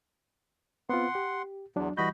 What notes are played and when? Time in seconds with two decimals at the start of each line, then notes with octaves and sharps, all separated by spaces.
0.89 B3 C4 F4 F#5 C6
1.15 G4
1.76 E2 F#3 D4
1.97 E3 G3 F#4 D#5 B5 G6